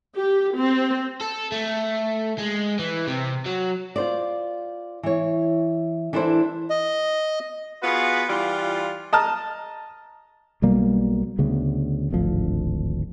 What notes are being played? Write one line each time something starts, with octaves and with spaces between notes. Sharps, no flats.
G4
C4
A4
A3
G#3
E3
C3
F#3
F4 C5 D5
E3 C#5
E3 D4 E4 A4 A#4 C5
D#5
B3 F4 F#4 G#4 B4
E3 G3 F4
D#5 A5 A#5 F6
B1 B2 G3 A#3
D2 C#3 B3
D1 G#1 D2 F3